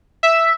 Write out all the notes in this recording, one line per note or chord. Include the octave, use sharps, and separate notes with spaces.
E5